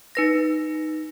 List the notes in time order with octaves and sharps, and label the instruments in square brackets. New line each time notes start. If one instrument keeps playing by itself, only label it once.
[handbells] D#4 B4 A#6